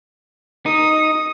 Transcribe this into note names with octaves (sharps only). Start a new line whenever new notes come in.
D#4 D#6